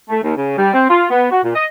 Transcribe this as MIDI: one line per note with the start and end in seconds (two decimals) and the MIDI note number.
0.09 0.21 57
0.22 0.36 39
0.36 0.56 49
0.58 0.72 55
0.74 0.85 60
0.89 1.07 65
1.10 1.30 59
1.31 1.43 66
1.44 1.51 46
1.55 1.65 75